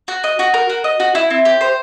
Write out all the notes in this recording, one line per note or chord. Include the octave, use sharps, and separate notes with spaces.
F#4
D#5
F#4
A#4
F#4
D#5
F#4
E4
C4
G4
C5